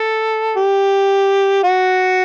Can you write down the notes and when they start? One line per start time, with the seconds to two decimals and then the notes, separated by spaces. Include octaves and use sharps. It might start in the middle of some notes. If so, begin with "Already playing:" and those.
Already playing: A4
0.56 G4
1.64 F#4